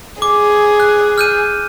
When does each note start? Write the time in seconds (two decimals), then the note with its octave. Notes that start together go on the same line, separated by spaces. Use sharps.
0.22 G#4 D6
0.80 F#6
1.18 F6 G6 D#7